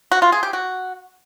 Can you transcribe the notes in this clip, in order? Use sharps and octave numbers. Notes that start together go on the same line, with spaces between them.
F#4
F4
G#4
G4
F#4